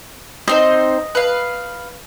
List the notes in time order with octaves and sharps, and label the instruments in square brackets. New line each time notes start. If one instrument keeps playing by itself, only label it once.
[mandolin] C4 D#4 C5 [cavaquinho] D#5
[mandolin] B4 F5